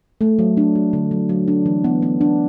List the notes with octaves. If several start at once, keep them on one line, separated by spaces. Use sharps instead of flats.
A3
F#3
D4
F#3
D3
F#3
F#3
D4
E3
B3
B3
D4